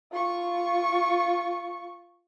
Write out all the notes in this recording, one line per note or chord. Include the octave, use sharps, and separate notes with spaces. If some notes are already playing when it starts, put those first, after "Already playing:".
F4 C#6